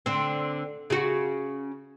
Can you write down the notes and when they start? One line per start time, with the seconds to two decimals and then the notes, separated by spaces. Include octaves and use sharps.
0.06 D3 C4
0.90 C#3 F#4